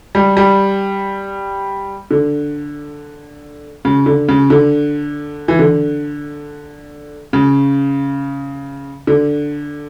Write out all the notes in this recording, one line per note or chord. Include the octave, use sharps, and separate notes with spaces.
G3
G3
D3
C#3
D3
C#3
D3
E3
D3
C#3
D3